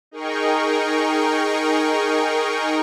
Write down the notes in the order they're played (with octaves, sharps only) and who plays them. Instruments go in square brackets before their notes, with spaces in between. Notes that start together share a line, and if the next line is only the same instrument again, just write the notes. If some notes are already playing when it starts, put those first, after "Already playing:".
[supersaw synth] D#4 G#4 A#4 G5 C#6